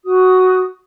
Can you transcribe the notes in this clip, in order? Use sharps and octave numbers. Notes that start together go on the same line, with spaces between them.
F#4 D#6